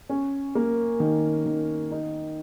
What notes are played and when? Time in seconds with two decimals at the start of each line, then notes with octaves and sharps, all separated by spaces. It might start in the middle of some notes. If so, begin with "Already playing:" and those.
0.09 C#4
0.55 A#3
1.00 D#3
1.46 D#3
1.91 D#4